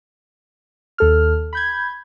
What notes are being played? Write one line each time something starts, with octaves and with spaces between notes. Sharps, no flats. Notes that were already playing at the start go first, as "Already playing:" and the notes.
D#2 A4 F6
B5 G6 G#6